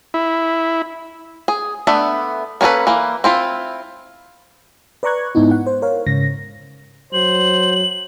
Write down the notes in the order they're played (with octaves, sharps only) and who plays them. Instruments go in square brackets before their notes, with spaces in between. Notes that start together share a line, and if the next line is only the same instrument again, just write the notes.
[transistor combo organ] E4
[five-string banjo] G#4
A3 B3 D4 E5
A#3 C#4 D4 A4 B4
E3 A#3
C4 E4 F4
[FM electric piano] B4 D5 A#5 C#6 F#6 G#6
G#2 B3 D#4 E4
F#5
C5
A#4 C#5 F5
G#2 C#3 A#6
[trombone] F#3 [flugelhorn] C5 [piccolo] F#7